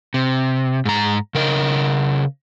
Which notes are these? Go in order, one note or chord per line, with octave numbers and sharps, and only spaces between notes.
C3
G#2 A#5
C#3 A#4 D#5